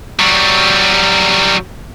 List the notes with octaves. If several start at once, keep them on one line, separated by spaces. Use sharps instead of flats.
F#3 G3